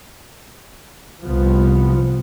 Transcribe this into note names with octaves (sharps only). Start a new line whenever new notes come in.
C2 F3 B3